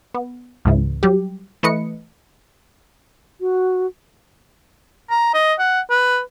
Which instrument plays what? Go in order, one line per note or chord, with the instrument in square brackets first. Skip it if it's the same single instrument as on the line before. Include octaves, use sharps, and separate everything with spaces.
[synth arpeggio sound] B3
C#2 G#2 C#3 E3
F#3 G3 G4
E3 A3 B4 D#5 C#7
[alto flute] F#4
[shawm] A#5
D#5
F#5
B4